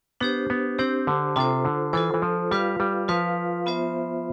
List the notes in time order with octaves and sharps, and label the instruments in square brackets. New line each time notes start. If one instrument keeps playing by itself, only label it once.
[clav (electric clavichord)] B3 [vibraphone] D4 G4 C5
[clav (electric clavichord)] B3
[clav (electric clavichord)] C4 [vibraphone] D4 G4 C5
[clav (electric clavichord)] D3
[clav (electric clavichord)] C3 [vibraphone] F4 A4 C5
[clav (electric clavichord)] D3
[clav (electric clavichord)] E3 [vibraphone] F4 A4 C5
[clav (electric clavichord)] E3
F3
[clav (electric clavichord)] G3 [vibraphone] F4 B4 F5
[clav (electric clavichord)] G3
[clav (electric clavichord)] F3 [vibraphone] F4 B4 F5
[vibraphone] B3 F4 C5 E5